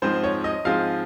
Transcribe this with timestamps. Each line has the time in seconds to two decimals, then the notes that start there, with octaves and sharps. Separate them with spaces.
0.02 G#2 F3 G#3 C4 C5
0.24 C#5
0.44 D#5
0.65 G#2 F3 G#3 C4 F5